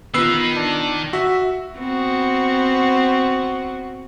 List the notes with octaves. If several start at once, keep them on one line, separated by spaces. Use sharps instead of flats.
D#3 B3 D#4 F4 B4 E6 C7
D4
F#4 E5 B6
B3 C4 F#4